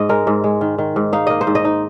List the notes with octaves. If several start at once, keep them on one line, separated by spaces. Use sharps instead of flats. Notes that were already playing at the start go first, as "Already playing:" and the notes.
Already playing: G#2 D#5
G#3 A#4
G#2
G#3
D#3
D#3
G#2
D#4 F5
A#3 D#5
C5
G#2
D#5
D#4